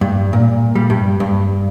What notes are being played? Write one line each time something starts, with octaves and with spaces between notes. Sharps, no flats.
G2
A#2
G3
G2
G2